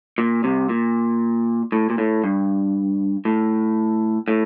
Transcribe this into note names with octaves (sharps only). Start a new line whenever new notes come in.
A#2
C2 C3
A#2
A2
A#2
A2
G2
A2
A2